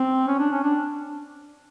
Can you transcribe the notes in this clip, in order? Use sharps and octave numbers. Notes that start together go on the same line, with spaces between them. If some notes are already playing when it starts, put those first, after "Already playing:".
Already playing: C4
C#4
D4
C#4
D4